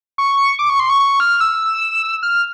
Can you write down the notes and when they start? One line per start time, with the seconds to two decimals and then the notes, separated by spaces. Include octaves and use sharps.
0.18 C#6
0.59 D6
0.70 C#6
0.80 C6
0.90 C#6
1.00 C#6
1.20 F6
1.41 E6
2.23 F6